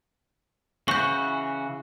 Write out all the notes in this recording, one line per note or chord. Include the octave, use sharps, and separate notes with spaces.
C#3 E3 F#4 C#6 G6